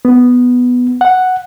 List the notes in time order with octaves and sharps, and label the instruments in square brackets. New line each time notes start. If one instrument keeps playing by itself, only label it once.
[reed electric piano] B3
F#5